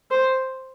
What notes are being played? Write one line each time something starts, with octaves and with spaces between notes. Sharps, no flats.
C5